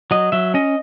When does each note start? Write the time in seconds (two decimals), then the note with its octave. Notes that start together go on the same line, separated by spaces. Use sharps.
0.11 F#3 D#5
0.32 F#3 E5
0.54 C#4 D#5